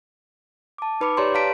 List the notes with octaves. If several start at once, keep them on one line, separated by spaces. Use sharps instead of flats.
A5 D6
D#4 B4 B5 D6 C#7
G4 B4 C#5 D5 A#5 C6
F5 A5 A#5 B6 D7